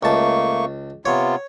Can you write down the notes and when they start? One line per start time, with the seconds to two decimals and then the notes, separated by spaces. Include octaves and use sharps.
0.03 C#2 A3 A#3 A5 C#6
1.05 C3 B3 F4 C#5